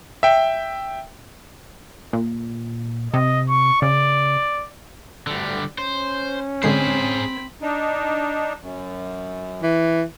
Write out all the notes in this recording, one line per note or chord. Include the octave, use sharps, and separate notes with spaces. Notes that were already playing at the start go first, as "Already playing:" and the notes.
E5 G5
A#2
C3 D#5
C#6
C#3 D5
D2 D3 G3
C#4 C5
D3 G#3 C4 G#4 C5 B5 C7
D4 D#4
F#2
E3